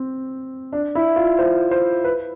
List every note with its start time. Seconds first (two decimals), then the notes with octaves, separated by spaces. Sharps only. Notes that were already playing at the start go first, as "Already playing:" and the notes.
Already playing: C4
0.73 D4
0.95 E4
1.16 F4
1.39 C5
1.71 C5
2.04 B4